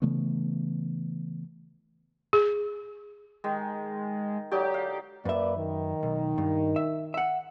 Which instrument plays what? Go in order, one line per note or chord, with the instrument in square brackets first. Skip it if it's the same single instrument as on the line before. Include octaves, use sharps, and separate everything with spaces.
[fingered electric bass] C#3 E3 A3 B3
[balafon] G#4
[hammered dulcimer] D#3 [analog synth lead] G#3
[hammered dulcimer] D3 F#3 D#4 [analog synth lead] G4
[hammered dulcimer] F5
[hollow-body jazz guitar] F#2 E5 [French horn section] A#3 B4 D5
[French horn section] D#3
[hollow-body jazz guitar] B1
G2
E5
E5 F#5